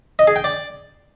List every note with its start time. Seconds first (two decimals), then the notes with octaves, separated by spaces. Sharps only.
0.19 D#5
0.27 G#4
0.36 G5
0.44 D5